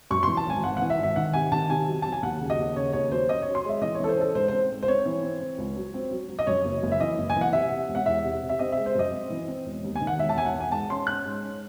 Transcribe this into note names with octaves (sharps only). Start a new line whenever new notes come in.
F#2 C#6
E3 C6
A5
G#1 G#5
G#1 F#5
E3 F#5
E5
G#1
E5
D#3 F#5
C3 G#5
D#3 A5
C3 G#5
F#3
F#3 A5
G#5
D#2 F#5
C#3
D#5
D#2
C#3 C#5
D#2 C#5
F#3 C5
C#4 D#5
C#4 C#5
C6
G#3 E5
E3 D#5
C#5
E3 A4
C5
C#4 A4
G#2 C5
C4 C5
G#2
C5
C4 C#5
E3
C4
C4
C#2
F#3
C4
F#3
F#3
D#5
F#2 C#5
F#1
F#1
E5
E3 D#5
F#1
G#5
E3
F#5
C3 E5
C3
E1
F#5
E2 E5
C3
C3
E5
C4 D#5
G#3 E5
C5
F#2 D#5
C4
E3
C4
E1
D#2
G#5
D#3
F#5
E1 E5
A5
E1 G#5
F#5
E1
G#5
G#2 A5
C#4 C6
C#4 F#6
G#2
C#4